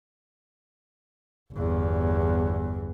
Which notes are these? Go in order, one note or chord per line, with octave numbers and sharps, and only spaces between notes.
G1 E2